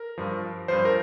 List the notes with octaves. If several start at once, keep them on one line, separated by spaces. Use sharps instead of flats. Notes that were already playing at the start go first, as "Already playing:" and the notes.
Already playing: A#4
G2 F3
G2 F3 C5
A#4